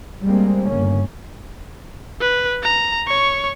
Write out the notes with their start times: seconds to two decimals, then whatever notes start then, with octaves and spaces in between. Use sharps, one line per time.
0.23 G3 G#3 A#3 C4
0.68 G1 C#3 A#3 C#4
2.21 B4
2.63 A#5
3.07 C#5 C#6